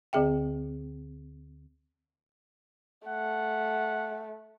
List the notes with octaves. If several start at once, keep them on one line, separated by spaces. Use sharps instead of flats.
D2 D3 C4 G#4 E5 G5
A3 F#5